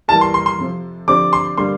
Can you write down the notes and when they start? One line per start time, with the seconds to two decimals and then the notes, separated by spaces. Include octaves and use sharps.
0.08 E3 G3 A#3 E4 A#4 A5
0.21 C6
0.34 C6
0.46 C6
0.58 F2 C3 F3
1.08 D3 F3 C4 G4 D5 D6
1.33 C6
1.57 D3 G3 A#3 C6